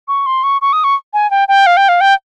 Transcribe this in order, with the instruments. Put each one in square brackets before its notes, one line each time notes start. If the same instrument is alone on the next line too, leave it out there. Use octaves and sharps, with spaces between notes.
[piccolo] C#6
C6
C#6
C#6
D#6
C#6
G#5
G5
G5
F5
G5
F5
G5